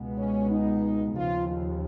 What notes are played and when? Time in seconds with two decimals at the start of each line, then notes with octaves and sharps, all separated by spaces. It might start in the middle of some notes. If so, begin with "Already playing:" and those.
Already playing: C#2 B2 G#3 B3
0.17 C#4
0.50 D#4
1.15 D#2 C#3 F3 F4
1.48 F4